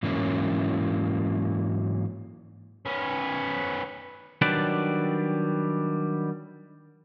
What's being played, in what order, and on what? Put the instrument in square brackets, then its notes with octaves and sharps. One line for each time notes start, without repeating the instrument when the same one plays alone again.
[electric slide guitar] G#2 E3 F#3 A#3 C#4 E4
[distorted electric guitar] B3 C#4
[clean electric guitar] D#3 F#3 G3 D4 B4 D5